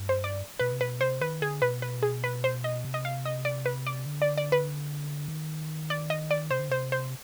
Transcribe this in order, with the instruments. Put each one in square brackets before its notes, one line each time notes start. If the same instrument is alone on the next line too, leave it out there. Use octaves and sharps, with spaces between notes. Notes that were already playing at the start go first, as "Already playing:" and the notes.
Already playing: [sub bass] G2
[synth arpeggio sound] C5
D5
[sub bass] B2 [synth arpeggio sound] B4
[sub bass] C3
[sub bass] B2 [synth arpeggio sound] B4
[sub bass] C3 [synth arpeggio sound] C5
[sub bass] D#3 [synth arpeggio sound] B4
[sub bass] D3 [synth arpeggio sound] G#4
[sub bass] B2 [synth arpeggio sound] B4
[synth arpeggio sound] B4
G#4
B4
C5
D#5
[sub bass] C3
[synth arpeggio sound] D#5
F5
D#5
D5
B4
D5
[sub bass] D3
[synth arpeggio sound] D5
D5
B4
[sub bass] D#3
[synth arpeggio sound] D5
D#5
D5
[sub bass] C3 [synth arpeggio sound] C5
[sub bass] D3
[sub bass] C3 [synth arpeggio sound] C5
[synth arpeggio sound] C5